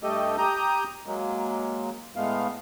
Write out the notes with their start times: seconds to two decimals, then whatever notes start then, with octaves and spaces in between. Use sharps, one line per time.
0.03 G2 A3 G4 A4 D#5
0.38 G4 A#5 D#6 G6
1.06 F#3 G#3 A#3
2.16 A2 G#3 A3 B3 F5